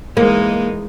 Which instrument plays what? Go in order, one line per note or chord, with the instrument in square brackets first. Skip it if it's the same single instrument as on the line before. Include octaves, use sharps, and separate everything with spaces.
[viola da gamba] E3 G#3 D#4 [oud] A#3